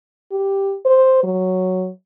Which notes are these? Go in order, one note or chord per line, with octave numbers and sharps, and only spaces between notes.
G4
C5
F#3